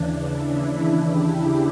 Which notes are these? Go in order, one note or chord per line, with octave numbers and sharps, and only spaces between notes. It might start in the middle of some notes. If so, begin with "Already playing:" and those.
Already playing: D#2 C#3 E3 D4
E4
G4
G#4